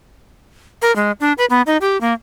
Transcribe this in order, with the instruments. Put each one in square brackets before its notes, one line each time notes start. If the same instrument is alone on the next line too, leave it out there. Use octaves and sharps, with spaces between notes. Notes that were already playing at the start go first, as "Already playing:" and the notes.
[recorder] A#4
G#3
D4
B4
B3
D#4
G4
A#3